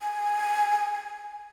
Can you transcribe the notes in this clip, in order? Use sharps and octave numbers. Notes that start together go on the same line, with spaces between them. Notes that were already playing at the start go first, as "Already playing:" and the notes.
G#5